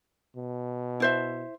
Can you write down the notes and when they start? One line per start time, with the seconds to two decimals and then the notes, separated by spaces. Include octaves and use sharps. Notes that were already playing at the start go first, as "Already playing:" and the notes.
0.36 B2
1.00 E4 C5 E5